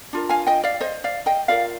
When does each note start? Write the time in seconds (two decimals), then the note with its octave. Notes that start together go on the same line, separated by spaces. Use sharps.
0.13 D4 F4 A#4
0.29 F5 G#5
0.47 D#5 G5
0.63 D5 F5
0.81 C5 D#5
1.04 D5 F5
1.26 D#5 G5
1.48 F4 A#4 D5 F5